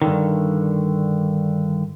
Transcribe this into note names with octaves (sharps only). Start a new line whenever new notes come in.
G2 D3 D#3